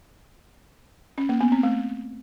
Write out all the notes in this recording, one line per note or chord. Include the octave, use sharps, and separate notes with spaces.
C#4
A#3
B3
C4
A3